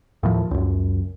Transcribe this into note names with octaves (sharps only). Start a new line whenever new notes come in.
D#2 A2 F3
C#2 F#2